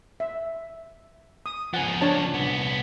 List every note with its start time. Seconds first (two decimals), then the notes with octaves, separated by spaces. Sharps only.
0.20 E5
1.46 D#6
1.74 C#3 F3 F#5 G#5
2.01 D4 C#5 A5
2.34 C2 B3